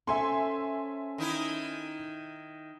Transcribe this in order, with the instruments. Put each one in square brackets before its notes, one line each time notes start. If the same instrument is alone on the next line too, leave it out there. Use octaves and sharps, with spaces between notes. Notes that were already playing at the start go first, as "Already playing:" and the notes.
[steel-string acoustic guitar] C#4 A4 C5 [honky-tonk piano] E5 G#5 C6
[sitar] D#3 D#4 E4